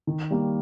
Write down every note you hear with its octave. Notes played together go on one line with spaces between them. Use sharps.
D#3
G3 A#3